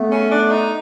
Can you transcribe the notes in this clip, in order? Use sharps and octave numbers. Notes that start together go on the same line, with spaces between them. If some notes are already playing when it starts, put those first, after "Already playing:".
Already playing: A3 B3
C#4
D4
D#4